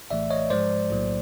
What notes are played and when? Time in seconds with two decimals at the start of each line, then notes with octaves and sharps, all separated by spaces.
0.10 A#1 A2 E3 A3 D5 E5
0.30 C#5 D#5
0.50 G#2 F3 G#3 C5 D5
0.90 B1 A2 F#3 A#3